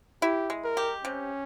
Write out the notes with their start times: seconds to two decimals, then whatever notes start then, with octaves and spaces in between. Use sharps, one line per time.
0.22 E4 G4
0.50 G#3
0.64 A#4
0.77 G4
1.04 C3 C#4